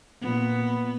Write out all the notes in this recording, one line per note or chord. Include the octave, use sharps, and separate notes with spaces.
A#2 B3